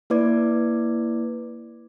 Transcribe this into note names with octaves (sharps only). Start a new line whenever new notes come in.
A#3 E4 B4 D5 D6 G#6